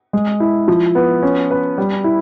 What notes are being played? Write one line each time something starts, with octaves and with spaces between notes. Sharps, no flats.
G#3
E4
F3
B3
C#4
B4
G3
E4